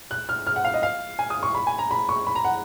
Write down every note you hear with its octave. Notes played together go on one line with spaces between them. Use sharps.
F#6
F6
F6
F#5
F5
D#5
F5
G#5
D#6
C#6
B5
G#5
A#5
B5
C#6
B5
A#5
F#5